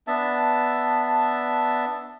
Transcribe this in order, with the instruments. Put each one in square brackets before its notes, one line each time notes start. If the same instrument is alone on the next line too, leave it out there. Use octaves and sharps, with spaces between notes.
[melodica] B3 D4 E5 A5